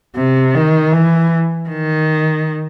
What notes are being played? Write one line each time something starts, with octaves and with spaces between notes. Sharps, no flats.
C3
D#3
E3
D#3